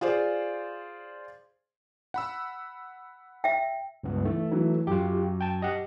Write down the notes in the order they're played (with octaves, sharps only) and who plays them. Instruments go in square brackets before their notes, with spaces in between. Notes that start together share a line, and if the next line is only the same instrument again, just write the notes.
[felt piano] F4 G#4 C5 D5
[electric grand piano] F#5 B5 E6
[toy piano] E5 G5
[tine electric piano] C#2 G2 B3
[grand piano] E3 [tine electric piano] A3
[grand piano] E3 F#3
[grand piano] F#2 [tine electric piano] F4 G4
[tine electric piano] G5 A5
[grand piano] G4 [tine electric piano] D#5 F#5